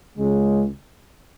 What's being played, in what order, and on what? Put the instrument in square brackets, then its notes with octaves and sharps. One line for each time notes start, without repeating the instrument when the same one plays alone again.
[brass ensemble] C#2 C#3 G#3